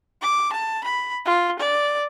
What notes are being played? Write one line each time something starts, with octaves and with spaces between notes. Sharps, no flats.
D6
A5
B5
F4
D5